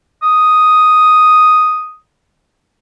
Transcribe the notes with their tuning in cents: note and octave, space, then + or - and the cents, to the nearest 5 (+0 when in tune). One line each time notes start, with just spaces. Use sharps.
D#6 +0